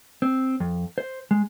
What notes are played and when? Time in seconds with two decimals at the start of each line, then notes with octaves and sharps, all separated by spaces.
0.22 C4
0.60 F2
0.98 C5
1.31 G#3